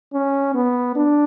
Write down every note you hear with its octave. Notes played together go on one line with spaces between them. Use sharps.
C#4
B3
D4